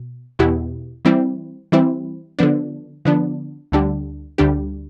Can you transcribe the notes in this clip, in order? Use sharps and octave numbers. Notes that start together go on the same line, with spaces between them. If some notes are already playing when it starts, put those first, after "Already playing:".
Already playing: B2
E2 B2 B3 E4 G4
E3 G3 C4 E4
E3 G3 C4 E4
D3 F3 B3 D4
D3 F3 B3 D4
D2 D3 G3 D4 G4
D2 D3 G3 D4 G4